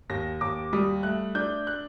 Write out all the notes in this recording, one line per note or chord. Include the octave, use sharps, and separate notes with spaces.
D#2 A#6
D#2 D6
G3 D#6
A3 F#6
D4 G6
F#6